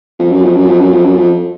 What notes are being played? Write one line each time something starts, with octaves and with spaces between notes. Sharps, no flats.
F2
F#2
F2
F#2
F2
F#2
F2
F#2
F2